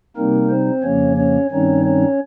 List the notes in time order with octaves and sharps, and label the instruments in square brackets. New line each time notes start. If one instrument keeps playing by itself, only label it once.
[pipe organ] C3 G3 A#3 C4 D#4 A#4
C4 C5
F2 C#3 F3 A#3 C#4 C#5
C#4 C#5
G2 D#3 G3 C4 C#4 D#4 C#5
C#4 C#5